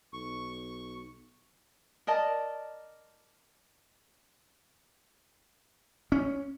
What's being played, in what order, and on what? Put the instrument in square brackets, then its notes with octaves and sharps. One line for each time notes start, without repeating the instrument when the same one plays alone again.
[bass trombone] B1 [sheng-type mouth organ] C#6
[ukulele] A#4 D5 D#5 A5
[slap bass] C#4